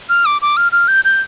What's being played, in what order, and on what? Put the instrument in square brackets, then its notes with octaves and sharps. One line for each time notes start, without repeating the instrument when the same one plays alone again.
[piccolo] F6
D6
D6
F6
F6
G6
G6